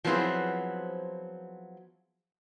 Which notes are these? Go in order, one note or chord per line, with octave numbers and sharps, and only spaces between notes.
F3 F#3 B3 C4 E4 G#4